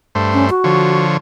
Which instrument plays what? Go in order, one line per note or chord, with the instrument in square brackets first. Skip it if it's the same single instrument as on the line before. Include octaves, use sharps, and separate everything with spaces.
[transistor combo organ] G2 A3 C5
[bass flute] C#4
F#4
[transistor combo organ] D3 F3 C#5